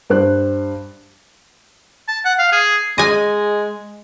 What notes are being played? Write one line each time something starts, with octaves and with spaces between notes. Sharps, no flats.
G2 C5 F#6
A5
F#5
F5
G#4
G#3 D#5 G#5